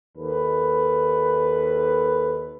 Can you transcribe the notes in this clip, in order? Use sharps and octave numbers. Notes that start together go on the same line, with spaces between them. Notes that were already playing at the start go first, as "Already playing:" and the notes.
D#2 A4 B4